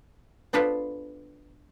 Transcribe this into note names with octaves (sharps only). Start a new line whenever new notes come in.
B3 D4 F4 A4 B4 C5